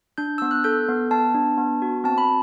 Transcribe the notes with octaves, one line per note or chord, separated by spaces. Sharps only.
D4 G6
B3 E6
F#6
A4 G6
B3
B3 A5
D4
B3
F#4
C4 A5
B5